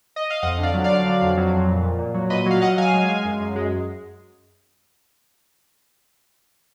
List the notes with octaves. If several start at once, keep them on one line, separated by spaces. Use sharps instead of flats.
D#5
F5
F2 D#5 F#5
D3 D5 F5
F#3
D5 F5
D3
F#3
F2
F#3
F2
A#2
A#2
A#2
F#3
A#2 B4 D#5
F#3 F5
F#3 D#5 F#5
F#3 F5 G#5
G#3
G#3
F#2
F#2
G#3